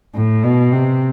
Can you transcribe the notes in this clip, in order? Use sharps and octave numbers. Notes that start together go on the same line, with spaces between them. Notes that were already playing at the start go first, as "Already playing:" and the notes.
A2
B2
C3